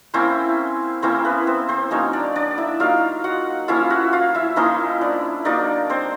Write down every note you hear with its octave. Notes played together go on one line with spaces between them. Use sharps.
A#3 C4 C#4 E4 C5
A#3 C4 C#4 E4 C5
B3 B4
C4 C5
C4 C5
F#3 A#3 C#4 D#4 C#5
D4 D5
D4 D5
E4 E5
F#3 A#3 D#4 F4 F5
F#4 F#5
F3 A#3 C#4 E4 F4 F5
F#4 F#5
F4 F5
E4 E5
F3 A#3 C#4 D#4 E4 D#5
D4 D5
F#3 A#3 D4 D#4 D5
C4 C5